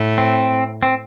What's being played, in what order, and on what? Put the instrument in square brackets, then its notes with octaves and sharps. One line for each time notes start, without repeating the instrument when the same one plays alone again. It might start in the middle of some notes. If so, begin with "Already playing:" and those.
Already playing: [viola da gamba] A2
[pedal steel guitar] C4
C4